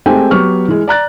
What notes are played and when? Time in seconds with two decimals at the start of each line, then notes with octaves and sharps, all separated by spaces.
0.06 G#3 A3 C4 G4 G5 G#5
0.31 F#3 B3 G4 C#6 F6
0.68 E3 G#3
0.88 D5 A#5 F#6 A6